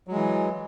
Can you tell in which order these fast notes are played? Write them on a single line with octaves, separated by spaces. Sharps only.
F#3 G#3 E3